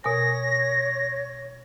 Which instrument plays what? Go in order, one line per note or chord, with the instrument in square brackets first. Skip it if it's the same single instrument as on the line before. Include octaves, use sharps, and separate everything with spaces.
[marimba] B2 A#4 G#5 [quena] C#5 [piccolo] A#6